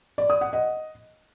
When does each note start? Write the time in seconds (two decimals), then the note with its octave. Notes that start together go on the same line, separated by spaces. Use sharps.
0.18 D5
0.30 D#6
0.41 F#5
0.53 D#5